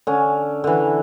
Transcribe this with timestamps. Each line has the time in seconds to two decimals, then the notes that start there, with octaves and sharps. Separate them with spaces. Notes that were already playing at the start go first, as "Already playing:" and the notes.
0.07 D3 C#4
0.64 D3 E3